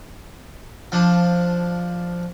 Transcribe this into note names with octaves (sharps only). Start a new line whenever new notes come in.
F3 D4